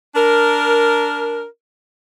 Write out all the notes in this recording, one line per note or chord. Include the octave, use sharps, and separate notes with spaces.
D4 A#4